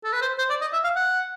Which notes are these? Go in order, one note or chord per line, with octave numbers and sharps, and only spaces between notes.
A4
B4
C5
C5
D5
D#5
E5
F5
F#5